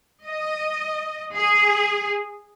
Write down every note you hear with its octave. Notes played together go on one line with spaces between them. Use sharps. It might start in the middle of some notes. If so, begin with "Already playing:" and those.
D#5
G#4